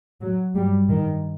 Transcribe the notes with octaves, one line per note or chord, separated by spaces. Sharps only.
F#3
G2 G3
D#3